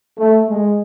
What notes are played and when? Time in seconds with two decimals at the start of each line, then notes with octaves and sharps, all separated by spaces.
0.18 A3
0.49 G#3